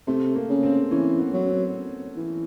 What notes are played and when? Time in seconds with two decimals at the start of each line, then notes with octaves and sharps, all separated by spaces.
0.07 C3 A3
0.35 A#3
0.49 C#3
0.63 C4
0.91 E3 C#4
1.19 B3
1.34 F#3
1.47 C4
2.17 E3